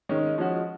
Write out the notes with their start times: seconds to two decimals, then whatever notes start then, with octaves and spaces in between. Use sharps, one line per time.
0.09 D#3 G#3 C#4
0.38 F3 G#3 C#4 F#4